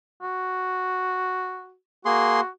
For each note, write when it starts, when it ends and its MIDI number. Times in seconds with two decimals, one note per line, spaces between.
0.22 1.75 66
2.05 2.41 58
2.05 2.49 66
2.05 2.41 68
2.05 2.41 84